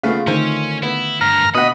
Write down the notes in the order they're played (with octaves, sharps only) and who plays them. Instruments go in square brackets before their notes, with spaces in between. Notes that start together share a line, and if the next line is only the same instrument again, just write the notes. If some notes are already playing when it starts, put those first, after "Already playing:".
[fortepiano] C#3 A3 B3 [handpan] F4 F5
[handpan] D3 D#3 A3 [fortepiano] C4 C5 [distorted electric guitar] C#4
[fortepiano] B3 [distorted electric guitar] E4
[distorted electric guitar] G2 [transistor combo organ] A#5 F6
[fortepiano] B2 F#5 [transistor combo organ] D#5 [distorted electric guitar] B5